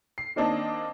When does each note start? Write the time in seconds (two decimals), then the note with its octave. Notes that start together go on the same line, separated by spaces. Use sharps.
0.18 C7
0.36 D#3 A#3 C4 D4 D#4 D#5